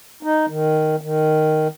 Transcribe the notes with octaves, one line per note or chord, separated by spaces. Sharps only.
D#4
D#3
D#3